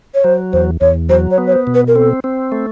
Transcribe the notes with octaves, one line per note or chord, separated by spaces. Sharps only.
C#5
F#3 C5
E2 C5
E2 C#5
F#3 C5
C#5
B3
C#5
C5
B2
B4
A#4
C4 A4
C4
A3